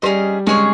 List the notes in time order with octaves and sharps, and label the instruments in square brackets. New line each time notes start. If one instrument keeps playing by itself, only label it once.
[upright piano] G3 [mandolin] C#4 G#4 C5 D#5
[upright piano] G#3 [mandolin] C#4 G#4 C#5